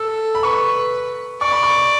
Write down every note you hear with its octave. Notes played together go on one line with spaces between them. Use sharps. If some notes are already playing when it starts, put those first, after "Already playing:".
Already playing: A4 E6
B5
B4 C#6
D5 C#6
B5
C#6